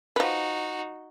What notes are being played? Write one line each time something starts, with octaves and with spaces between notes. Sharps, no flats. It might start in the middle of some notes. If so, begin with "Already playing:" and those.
F3 D#4 F#4 B4